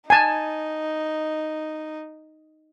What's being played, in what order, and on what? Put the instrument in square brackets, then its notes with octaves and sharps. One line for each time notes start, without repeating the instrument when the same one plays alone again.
[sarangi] D#4 [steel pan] G#5 A5